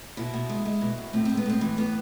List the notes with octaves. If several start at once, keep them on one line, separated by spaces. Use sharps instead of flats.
B2 E4
B2
G#3
G#3
B2
B2
A2 C4
G#3 C4
B3
A2 C4
E3
A2 B3